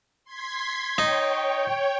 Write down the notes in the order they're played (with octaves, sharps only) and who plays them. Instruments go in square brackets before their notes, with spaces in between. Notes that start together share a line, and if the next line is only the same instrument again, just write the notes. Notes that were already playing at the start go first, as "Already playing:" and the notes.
[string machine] C6 G#6 B6
[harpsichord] D#4 [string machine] C#5 G5